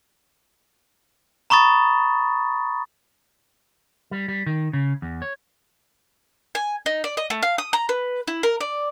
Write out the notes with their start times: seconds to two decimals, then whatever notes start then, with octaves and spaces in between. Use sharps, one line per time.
1.50 A#5 B5 C#6 D#6 A6
4.11 G3
4.28 G3
4.46 D#3
4.73 C#3
5.02 E2
5.22 C#5
6.55 G#5
6.86 D#4
7.04 D5
7.17 D#5
7.30 A3
7.43 F5
7.58 D#6
7.73 A#5
7.89 B4
8.27 E4
8.43 A#4
8.61 D5